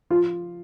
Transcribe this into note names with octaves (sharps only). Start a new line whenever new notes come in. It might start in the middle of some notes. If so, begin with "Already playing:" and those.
F3 F4